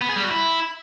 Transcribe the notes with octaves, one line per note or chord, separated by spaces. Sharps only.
B3
G#4
G3
F#4
E4